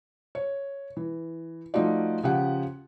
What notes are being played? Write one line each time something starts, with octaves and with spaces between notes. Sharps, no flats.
C#5
E3
F3 A3 D#4 F4 F#4 D5
C#3 F3 G4 F#5